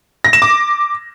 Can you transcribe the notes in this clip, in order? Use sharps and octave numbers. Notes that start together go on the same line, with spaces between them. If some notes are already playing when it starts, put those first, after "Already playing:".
A#6
E7
D6